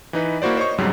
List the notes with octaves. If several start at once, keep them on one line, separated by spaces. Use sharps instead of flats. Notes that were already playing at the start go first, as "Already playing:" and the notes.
E3 D#4 B4
A#3 E4 F#4 C5 D5
C5 C#5 D#5 C#6
F2 G#2 C#3 F#3 G3